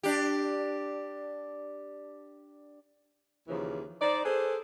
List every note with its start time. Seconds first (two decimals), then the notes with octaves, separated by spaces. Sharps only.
0.03 D4 G4
3.47 D#2 C#3 E3 F3
4.01 D#4 C5 D5
4.24 G#4 A4 B4 C5